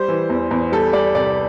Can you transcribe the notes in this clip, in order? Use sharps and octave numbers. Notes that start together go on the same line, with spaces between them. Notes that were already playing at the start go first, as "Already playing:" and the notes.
Already playing: G3 C5
E3
E2
E2
G3 A4
G3 D5
C2 D5